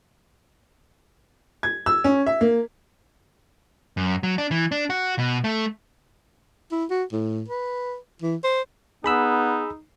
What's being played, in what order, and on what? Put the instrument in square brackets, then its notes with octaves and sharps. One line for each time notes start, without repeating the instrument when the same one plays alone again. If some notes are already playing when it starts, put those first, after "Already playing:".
[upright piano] G#6
E6
C#4
E5
A#3
[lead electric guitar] F#2
F#3
D4
E3
D4
F#4
B2
A3
[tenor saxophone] E4
F#4
A2
B4
E3
C5
[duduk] B3 [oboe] D#4 [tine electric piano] G#4 B5 E6